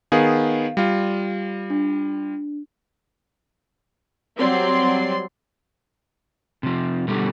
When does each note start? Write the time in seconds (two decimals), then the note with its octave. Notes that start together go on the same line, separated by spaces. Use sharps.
0.12 D#3 B3 G#4 F5
0.77 G3 F4
1.70 D4
4.38 F#3 G3 C4 D5 C6
6.63 C3 F3
7.08 B2 D3 G3 A3